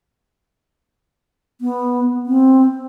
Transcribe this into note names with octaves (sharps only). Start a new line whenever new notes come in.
B3
C4